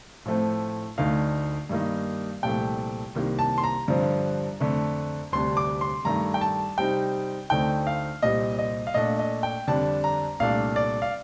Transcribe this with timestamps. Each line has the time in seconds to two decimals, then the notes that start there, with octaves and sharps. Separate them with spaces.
0.25 A2 F3 A3 C4
0.98 D2 D3 A3 D#4 F5
1.69 G2 D#3 A#3 D#4
2.43 C2 A#2 F3 A3 G5
3.15 C2 C3 D#3 A#3
3.39 A5
3.58 C6
3.64 A#5
3.88 G2 D3 F3 C4
4.60 F2 D3 A3
5.32 D2 C3 G3 D4 C6
5.57 D6
5.81 C6
6.05 G2 D#3 A3 A#5
6.34 G5
6.41 A5
6.77 C3 G3 C4 D#4 G5
7.50 D2 D3 A3 C4 D#4 G5
7.87 F5
8.23 C2 A#2 G3 C4 D#5
8.59 D#5
8.87 F5
8.94 A#2 A3 D4 D#5
9.19 D#5
9.43 G5
9.67 F2 D3 G3 D4 A5
10.04 A#5
10.40 C2 A#2 A3 D4 F5
10.76 D5
11.02 F5